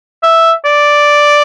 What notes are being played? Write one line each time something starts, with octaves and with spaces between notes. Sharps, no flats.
E5
D5